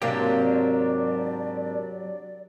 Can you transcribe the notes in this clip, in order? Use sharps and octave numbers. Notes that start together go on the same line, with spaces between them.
G#2 C3 F#3 A#3 D4 G4 D5